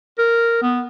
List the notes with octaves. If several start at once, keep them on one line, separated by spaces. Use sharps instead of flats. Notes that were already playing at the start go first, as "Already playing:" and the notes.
A#4
B3